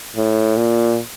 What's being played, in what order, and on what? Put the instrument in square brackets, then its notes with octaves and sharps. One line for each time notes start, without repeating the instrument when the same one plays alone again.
[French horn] A2
A#2